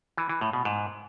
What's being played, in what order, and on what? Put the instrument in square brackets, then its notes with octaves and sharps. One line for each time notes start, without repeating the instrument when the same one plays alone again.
[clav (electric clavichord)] E3
E3
A2
B2
G#2